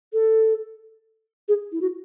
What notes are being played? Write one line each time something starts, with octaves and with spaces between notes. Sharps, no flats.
A4
G#4
E4
F#4